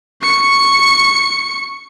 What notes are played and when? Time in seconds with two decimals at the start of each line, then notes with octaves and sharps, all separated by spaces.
0.22 C#6 C#7